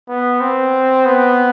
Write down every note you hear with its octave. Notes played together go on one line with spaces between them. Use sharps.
B3
C4
B3